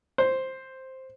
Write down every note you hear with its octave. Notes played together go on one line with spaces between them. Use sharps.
C5